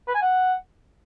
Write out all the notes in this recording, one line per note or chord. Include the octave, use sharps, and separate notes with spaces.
B4
G#5
F#5